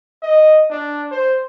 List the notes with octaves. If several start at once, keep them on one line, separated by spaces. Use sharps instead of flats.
D#5
D4
C5